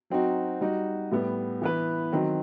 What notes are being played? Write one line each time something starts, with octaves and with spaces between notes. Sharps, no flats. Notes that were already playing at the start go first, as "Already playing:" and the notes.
F#3 C4 D#4 F#4
G3 D#4 F#4
A2 G3 B3
E3 B3 E4 B4
D#3 F#3 C4